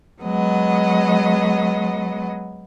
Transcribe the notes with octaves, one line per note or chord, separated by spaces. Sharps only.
F#3 G#3 B3 D#5